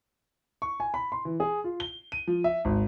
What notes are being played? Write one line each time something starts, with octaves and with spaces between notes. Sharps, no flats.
C#6
G#5
B5
C6
E3
G#4
F4
G7
D#7
F3
E5
G#1